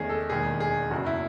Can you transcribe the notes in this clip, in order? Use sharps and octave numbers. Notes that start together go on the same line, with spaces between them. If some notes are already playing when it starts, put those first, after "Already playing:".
Already playing: E2 D#3 A3 C#4 G#4
A4
E1 D#2 D#3 G#4
G#4
F#1 E2 C#3 F#4
E4